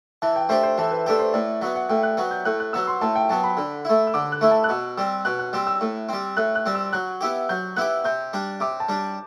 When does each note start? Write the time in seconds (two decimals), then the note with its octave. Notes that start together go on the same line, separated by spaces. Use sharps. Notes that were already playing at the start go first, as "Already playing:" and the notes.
0.22 E3 A5
0.36 G5
0.49 A3 D4 G4 C5
0.63 C5
0.78 E3 A4
0.91 B4
1.06 A3 D4 G4 A4
1.19 C5
1.33 A2 D5
1.61 F#3 B3 E5
1.75 F#5
1.89 A2 G5
2.03 F#6
2.17 F#3 B3
2.31 G6
2.45 A2 F#6
2.60 F#6
2.73 F#3 B3 E6
2.87 C6
3.02 A2 A5
3.16 G5
3.29 F#3 B3 A5
3.44 B5
3.57 D3
3.85 A3 E4
4.07 E6
4.14 D3 D6
4.32 F#6
4.41 A3 E4
4.51 A5
4.64 F#6
4.69 B2 E6
4.97 G3 C4 E6
5.25 B2 F#6
5.39 F#6
5.53 G3 C4 E6
5.67 E6
5.81 A2
6.09 G3 C4
6.37 A2 F#6
6.55 F#6
6.66 G3 C4
6.75 E6
6.93 F#3 F#6
7.21 B3 E4 G4
7.49 F#3 G6
7.77 B3 E4 G4 F#6
8.04 C3 G6
8.33 G3 D4
8.60 C3 D6
8.80 A5
8.89 G3 D4